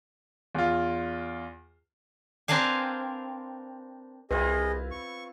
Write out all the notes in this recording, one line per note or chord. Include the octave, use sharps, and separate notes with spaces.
E2 F4
C4 D4 A#4 B4 F5 G#5
C2 C4 E4 F4 G#4 B4 D#5
C#6